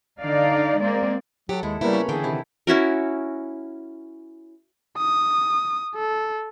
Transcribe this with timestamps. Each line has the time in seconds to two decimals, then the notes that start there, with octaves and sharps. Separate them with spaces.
0.22 D3 D#4 D5 F5
0.81 G#3 A#3 C4 D5
1.49 F#3 G4 A4 F#5
1.63 D#2 G#3 E4
1.81 C#3 G3 A#3 B3 E4 A#4 C#5
1.93 C#4 B5
2.09 D3 E3 G#4 A4 E5 G5
2.23 C3 D#3 E4
2.67 C#4 E4 F#4 A#4
4.98 D#6
5.96 A4